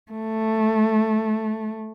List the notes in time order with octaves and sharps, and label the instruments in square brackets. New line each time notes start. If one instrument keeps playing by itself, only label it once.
[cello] A3